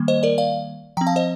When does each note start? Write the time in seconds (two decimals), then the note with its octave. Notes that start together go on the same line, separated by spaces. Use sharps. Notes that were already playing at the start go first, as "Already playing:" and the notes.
Already playing: D#3 G3 A#3
0.08 C5 D#5
0.23 A#4 D5
0.38 D5 F5
0.97 F3 G5 A#5
1.01 C4
1.07 F5 A5
1.16 C5 D#5